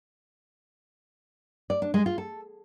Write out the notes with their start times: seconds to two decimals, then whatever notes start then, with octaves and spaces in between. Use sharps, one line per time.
1.70 D5
1.82 D4
1.94 G#3
2.06 F4
2.18 A4